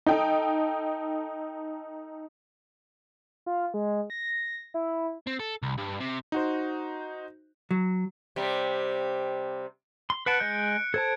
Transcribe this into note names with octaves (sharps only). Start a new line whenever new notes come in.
D#4 A4 G5
F4
G#3
A#6
E4
C4
A4
C2
G2
C3
D#4 F#4 C5
F#3
C3 G3
C6
B4 F#5 A5 F#6 C#7 D7
G#3 D#5 G6
A4 C5 A5 G#6